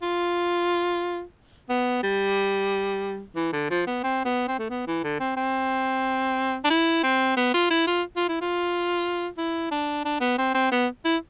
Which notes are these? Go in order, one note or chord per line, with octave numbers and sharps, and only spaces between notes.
F4
B3
G3
E3
D3
F3
B3
C4
B3
C4
A3
B3
E3
D3
C4
C4
D4
E4
C4
B3
F4
E4
F4
F4
E4
F4
E4
D4
D4
B3
C4
C4
B3
E4